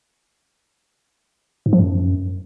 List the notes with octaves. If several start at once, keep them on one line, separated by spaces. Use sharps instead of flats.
G#2
F3
F#2